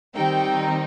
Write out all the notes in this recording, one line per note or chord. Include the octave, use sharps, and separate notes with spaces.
D#3 G3 C4 D#4 G5